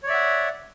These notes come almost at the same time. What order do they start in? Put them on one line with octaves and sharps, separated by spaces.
C#5 D5 E5 F#5